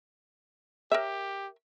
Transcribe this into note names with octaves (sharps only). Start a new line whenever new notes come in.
G4 A#4 C#5 E5